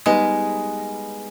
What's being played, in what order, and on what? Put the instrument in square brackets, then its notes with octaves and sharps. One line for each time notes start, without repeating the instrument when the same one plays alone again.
[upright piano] G3 B3 D#4 B4 D#5 [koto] G#3